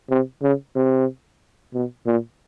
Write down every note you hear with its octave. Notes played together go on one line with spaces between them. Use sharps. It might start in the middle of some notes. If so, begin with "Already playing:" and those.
C3
C#3
C3
B2
A#2